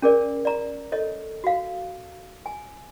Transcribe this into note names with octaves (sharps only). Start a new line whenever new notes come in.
C#4 G#4 A#4 D5
D5 A#5
A4 C#5 D#5
F#4 F5
G#5